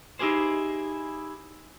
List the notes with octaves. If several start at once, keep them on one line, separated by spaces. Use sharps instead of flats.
D#4 E4 G4 G#4 C5